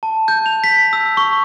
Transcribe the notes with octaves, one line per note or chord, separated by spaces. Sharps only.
A5
G6
F7
B6
E6
C#6